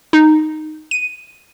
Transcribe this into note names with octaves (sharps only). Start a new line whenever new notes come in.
D#4
D#7